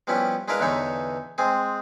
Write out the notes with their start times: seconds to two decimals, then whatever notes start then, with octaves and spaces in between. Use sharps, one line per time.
0.07 F3 G3 B3 C#4 E4
0.48 G#3 D4 E4 A#4 B4 F5
0.60 E2 D3 E3 D#4 C#5 E5
1.38 G#3 C4 G#4